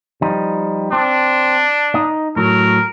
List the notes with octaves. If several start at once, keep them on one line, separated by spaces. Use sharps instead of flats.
F3 G3 D#4
C4 D4
D#4 D#5
A2 F#3 A#4